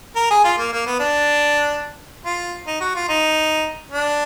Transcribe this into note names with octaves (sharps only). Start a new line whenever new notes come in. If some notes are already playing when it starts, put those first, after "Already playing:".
A#4
G#4
F4
A#3
A#3
B3
D4
F4
D#4
F#4
F4
D#4
D4